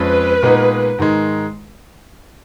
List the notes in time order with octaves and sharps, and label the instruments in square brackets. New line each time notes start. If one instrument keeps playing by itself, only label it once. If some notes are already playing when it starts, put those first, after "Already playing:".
Already playing: [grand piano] F2 F3 G#3 C#4 [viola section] B4
[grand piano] A#2 G#3 B3 D#4
G#2 D#3 G#3